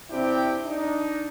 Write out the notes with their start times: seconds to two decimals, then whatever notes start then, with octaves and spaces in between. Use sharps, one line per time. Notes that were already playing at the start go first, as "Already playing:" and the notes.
0.10 C3 C4 D4 E4 G4 G5
0.66 D4 D#4